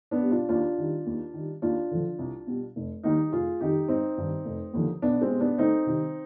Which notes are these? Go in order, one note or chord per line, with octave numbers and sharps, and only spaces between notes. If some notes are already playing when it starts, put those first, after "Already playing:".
B3 D4
B2 G3
D4 F4
D#2 D4 F4
D#3 G3
D#2
D#3 G3
D#2 D4 F4
D3 F3
C2
B2 G3
F1
D#2 D#3 G3 D#4 G4
F1 F4 G#4
F2 D#3 G3 D#4 G4
G#1 C4 D#4
G2 D#3 G3
F1
D#2 D3 F3
B1 B3 D4
G#3 C4
B2 G3
B3 D4
D2 C4 D#4
C3 D#3 G3